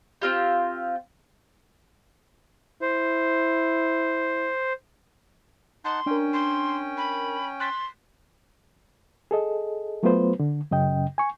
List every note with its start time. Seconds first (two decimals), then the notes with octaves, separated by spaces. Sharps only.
0.22 C4 F4 G4
2.82 E4 C5
5.85 D#4 F#5 A5 C6
6.06 C#4 D4 A#4 G5
6.33 C6
6.98 B5
7.60 C6 F#6 A6 B6
9.31 G#4 A4 D#5
10.03 F#3 A3 B3 F4 B4 C5
10.40 D3
10.71 F#2 C#3 D#5 G5
11.18 G#5 C#6